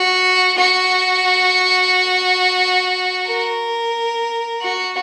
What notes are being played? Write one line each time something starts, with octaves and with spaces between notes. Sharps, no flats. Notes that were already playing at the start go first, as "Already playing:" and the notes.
Already playing: F#4
F#4
A#4
F#4